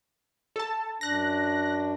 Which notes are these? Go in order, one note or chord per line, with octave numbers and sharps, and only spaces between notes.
A4 A5
F#2 D4 F#6 A#6